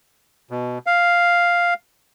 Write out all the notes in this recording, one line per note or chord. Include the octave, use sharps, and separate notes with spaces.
B2
F5